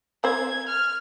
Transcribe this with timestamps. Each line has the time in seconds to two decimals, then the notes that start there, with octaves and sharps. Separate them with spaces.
0.24 C4 C5 G#6
0.69 F6